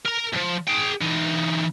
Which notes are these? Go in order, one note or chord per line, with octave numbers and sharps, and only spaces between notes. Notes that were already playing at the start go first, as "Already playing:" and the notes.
A#4 A#5
E2 F3
G#4 G5
E3 D#4